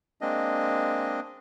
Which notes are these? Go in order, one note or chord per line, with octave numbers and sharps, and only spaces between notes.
G#3 A#3 C4 D4 D#5